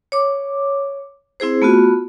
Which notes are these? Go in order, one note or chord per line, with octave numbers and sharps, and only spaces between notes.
C#5 D6
C4 E4 G#4 C5
A3 B3 F4 F#4